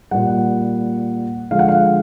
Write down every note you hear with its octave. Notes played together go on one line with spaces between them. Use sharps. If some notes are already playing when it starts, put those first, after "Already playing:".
A#2 G3 F#5
D3 F3 G#3 F5
F#5
F5